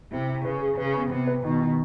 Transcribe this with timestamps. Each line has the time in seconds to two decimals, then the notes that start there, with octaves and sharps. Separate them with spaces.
0.11 C3 E4
0.28 E4
0.45 C#3 B4
0.61 G#4
0.77 C#3 B4
0.94 B3
1.11 C3 B3
1.27 B4
1.43 B2 D#3
1.60 D#3